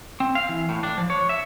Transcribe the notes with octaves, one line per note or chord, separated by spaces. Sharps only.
C4
F5
E3
A2
D4
F3
C#5
E5